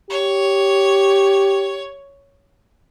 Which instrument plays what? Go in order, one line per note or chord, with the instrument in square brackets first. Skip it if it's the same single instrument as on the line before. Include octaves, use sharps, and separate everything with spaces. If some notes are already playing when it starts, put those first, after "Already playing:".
[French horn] G4 [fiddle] C#5